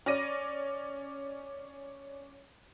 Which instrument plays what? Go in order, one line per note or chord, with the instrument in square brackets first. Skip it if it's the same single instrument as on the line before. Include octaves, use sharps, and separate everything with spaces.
[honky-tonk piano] C#4 D5 A#6 D#7